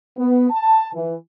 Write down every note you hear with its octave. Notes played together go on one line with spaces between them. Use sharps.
B3
A5
E3